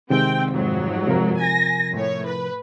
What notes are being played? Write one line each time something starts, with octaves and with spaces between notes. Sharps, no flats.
C3 D#3 G#3 C4 G5
F2 G#2 F#3
C3 F3 A#4
G#5 A#6
A2 C#5
B4